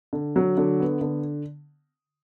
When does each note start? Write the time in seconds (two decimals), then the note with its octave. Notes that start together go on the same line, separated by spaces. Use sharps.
0.13 D3
0.36 F#3
0.57 D3
0.80 B3
1.01 D3